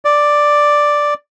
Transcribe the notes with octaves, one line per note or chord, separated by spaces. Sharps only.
D5